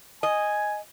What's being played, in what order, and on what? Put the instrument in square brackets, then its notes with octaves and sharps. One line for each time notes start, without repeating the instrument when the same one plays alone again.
[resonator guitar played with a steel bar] D#5 [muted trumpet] G#5